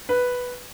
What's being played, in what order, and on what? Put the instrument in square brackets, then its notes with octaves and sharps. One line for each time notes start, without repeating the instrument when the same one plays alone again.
[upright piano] B4